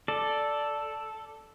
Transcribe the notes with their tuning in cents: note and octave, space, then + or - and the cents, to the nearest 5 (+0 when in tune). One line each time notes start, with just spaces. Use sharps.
A4 +0 D5 +0